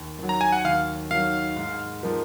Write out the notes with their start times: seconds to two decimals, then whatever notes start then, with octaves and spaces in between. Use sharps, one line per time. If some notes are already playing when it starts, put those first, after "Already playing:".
Already playing: D#2
0.19 D#3 F#3
0.29 A#5
0.41 G#5
0.52 F#5
0.65 D#2 F5
1.11 D#3 F#3 F5
1.56 G#2
2.03 F3 A#3 D#4